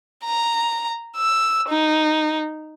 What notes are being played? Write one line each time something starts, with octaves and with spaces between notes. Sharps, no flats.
A#5
E6
D#4